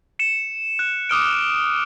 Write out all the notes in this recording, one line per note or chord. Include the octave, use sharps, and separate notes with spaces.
C#7 E7
F#6
D6 D#6 F6 D7